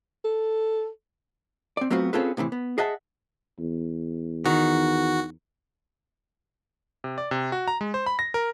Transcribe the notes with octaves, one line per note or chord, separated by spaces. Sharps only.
A4
C4 D5
F#3 A3 B3 C4 F4 F#4
C4 C#4 F4 G#4 A4 B4
A2 C3 D#3 E3
B3
G#4 D#5 E5 F#5 A5
E2
D#3 F#4
C3
D5
C3
F#4
A#5
G#3
C5
B5
A#6
A#4